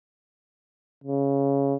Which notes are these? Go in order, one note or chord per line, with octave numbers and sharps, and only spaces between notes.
C#3